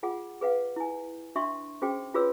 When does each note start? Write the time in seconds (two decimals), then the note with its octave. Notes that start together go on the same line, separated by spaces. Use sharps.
0.03 F4 G#4 F#5
0.41 G#4 B4 F5 F#5
0.76 E4 G#5
1.36 D4 F#4 E5 C6 C#6
1.82 C#4 F#4 G#4 C5 G5
2.14 F4 F#4 G#4 B4 C#5 E6